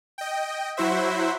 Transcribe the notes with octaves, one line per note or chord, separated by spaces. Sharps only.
D#5 G5
F#3 E4 F#4 C5 E5